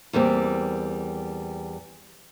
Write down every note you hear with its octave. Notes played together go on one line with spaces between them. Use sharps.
E2 G3 A#3 C4